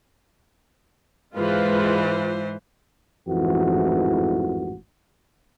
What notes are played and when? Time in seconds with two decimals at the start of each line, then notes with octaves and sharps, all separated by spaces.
1.35 G#2 E3 G#3 F4 B4 C5
3.28 A1 F2 G#2 E3 F#4